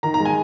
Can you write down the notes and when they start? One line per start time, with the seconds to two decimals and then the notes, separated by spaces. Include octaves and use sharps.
0.03 D#3 A#5
0.14 A#5
0.20 G#3
0.25 G#5